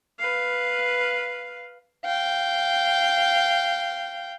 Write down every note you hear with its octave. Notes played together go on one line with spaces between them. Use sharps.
B4 F5
F5 G5